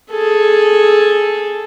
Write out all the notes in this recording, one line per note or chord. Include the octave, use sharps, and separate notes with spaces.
G#4 A4